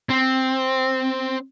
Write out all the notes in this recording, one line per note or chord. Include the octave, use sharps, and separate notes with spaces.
C4